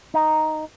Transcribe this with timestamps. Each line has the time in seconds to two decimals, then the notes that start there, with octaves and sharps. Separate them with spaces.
0.14 D#4